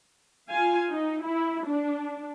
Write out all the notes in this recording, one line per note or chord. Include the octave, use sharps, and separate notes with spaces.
F4 F5 G#5
D#4
E4
D4